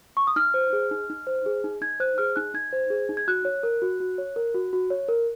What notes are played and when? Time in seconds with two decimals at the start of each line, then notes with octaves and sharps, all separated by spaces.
0.17 C#6
0.27 D#6
0.36 D#4 F6
0.54 C5
0.73 G#4
0.91 D#4
1.10 D#4
1.27 C5
1.46 G#4
1.64 D#4
1.81 D#4 G#6
2.00 C5 F#6
2.18 G#4 F6
2.36 D#4 F#6
2.54 D#4 G#6
2.73 C5
2.90 G#4
3.09 D#4
3.17 G#6
3.28 F#4 F#6
3.45 C#5
3.63 A#4
3.82 F#4
4.00 F#4
4.18 C#5
4.36 A#4
4.54 F#4
4.73 F#4
4.90 C#5
5.08 A#4